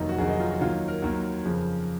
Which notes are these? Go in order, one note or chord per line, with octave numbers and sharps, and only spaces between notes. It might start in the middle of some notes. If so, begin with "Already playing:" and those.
Already playing: F1 D#2 D#3 F#3 D#4
F#4
F1 D#2 D#3 F#3 G#4
D#4
F4
F#4
D#2 D#3 F#3 F4
A#4
D#2 D#3 F#3
F2 C#3 F3